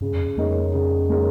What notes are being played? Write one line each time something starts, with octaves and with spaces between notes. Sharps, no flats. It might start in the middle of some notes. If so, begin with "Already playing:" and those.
G2 C#3
F2
F2 G#3 D#4 A#4 C#5
C#3
G#3 D#4 A#4 C#5